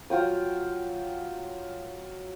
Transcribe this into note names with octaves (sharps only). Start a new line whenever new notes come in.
F#3 F4 G5 D#6